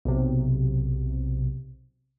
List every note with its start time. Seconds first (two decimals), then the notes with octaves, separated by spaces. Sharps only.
0.05 B1 C3